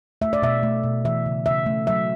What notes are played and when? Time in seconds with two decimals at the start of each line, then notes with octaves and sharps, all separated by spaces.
0.21 A3 E5
0.33 D5
0.42 B2 E5
0.63 A3
0.84 B2
1.05 E3 E5
1.26 C#3
1.46 C#3 E5
1.66 A3
1.87 F#3 E5